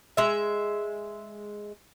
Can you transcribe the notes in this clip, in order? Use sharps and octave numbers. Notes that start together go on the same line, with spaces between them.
G#3 E5